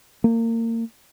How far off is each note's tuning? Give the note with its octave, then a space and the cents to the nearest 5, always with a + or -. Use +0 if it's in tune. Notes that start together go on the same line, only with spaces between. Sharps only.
A#3 -30